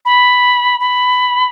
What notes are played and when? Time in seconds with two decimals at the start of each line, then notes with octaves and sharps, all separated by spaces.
0.05 B5
0.80 B5